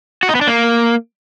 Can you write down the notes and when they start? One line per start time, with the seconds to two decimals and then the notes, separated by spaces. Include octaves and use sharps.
0.23 F#4
0.29 D#4
0.35 B3
0.41 D4
0.47 A#3